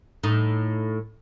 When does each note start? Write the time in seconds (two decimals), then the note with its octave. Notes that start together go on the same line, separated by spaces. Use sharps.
0.23 A2 D#4